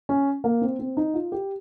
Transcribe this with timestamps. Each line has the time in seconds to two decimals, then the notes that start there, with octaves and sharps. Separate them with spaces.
0.09 C#4
0.44 A#3
0.62 C4
0.79 C4
0.97 D#4
1.14 F4
1.32 G4